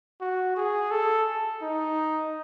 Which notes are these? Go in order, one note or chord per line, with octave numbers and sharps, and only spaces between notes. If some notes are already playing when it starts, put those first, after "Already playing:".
F#4
G#4
A4
D#4